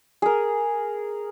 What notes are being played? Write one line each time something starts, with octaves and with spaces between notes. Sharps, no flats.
G#4 A#4